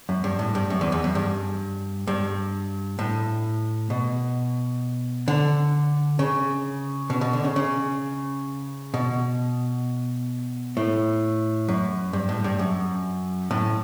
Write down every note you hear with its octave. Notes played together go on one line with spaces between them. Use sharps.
F#2
G2
A2
G2
F#2
E2
E2
F#2
G2
G2
A2
B2
D3
C#3
B2
B2
D3
C#3
C#3
B2
A2
F#2
G2
A2
G2
F#2
A2